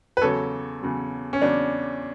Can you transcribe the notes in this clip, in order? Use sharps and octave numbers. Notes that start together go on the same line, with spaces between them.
B4
E2 C#3 F#3 A4 C#5
E2 C#3 F#3
C#4
E2 C#3 F#3 D4